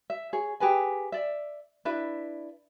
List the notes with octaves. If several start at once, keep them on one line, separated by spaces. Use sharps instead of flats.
E5
G#4 C#5
G4 G#4 B4 G#5
D5 E5
D4 E4 B4 E5